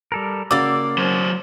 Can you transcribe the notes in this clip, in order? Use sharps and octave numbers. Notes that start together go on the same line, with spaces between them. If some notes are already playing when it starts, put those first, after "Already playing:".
G3 A4 A#4
C#3 A#3 F#4 D5 D6 E6 A6
F#3 C5